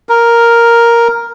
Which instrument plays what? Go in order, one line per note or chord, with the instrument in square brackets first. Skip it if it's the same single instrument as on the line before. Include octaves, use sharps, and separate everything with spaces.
[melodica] A#4